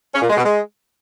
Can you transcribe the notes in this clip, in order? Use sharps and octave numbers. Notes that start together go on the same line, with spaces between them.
C#4
A#2
G#3
B2
G#3